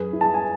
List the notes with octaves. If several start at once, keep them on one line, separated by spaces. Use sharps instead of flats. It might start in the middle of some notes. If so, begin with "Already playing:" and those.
Already playing: F#2 G#4 B4
E4
A5
G#5